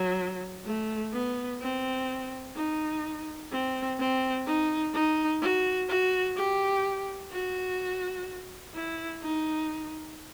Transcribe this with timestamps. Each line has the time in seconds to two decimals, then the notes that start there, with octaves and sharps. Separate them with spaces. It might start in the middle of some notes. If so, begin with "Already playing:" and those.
Already playing: F#3
0.66 A3
1.13 B3
1.61 C4
2.56 D#4
3.51 C4
3.99 C4
4.46 D#4
4.94 D#4
5.41 F#4
5.89 F#4
6.36 G4
7.31 F#4
8.74 E4
9.22 D#4